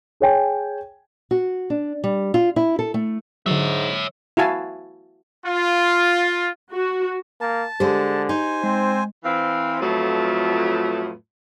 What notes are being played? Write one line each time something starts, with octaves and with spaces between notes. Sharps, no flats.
G#4 C#5 G5 G#5
F#4
D4
G3
F4
E4
A4
A3
G#2 D3 F#3 C#5 E5
E4 F#4 F5 G#5 A5
F4
F#4
A#3 A5
D3 G#3 G4 C5
D#4 C5 G#5
G#3 C4
E3 C4 F5
F2 A2 F#3 A3 B3 F4